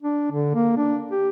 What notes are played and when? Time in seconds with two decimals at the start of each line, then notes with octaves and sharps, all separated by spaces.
0.03 D4
0.32 D3
0.55 A#3
0.77 D4
1.11 G4